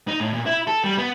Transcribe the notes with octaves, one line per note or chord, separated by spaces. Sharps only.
D#4
A2
A#2
E4
A4
G3
B3